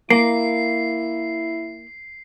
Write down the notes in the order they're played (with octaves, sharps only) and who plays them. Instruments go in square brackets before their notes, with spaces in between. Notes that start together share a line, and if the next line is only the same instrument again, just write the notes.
[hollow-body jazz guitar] A#3 [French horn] E4 [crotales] C7